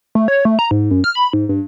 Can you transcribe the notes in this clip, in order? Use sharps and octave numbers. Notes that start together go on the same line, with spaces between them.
A3
C#5
A3
A#5
G#2
F#2
F6
B5
G#2
G2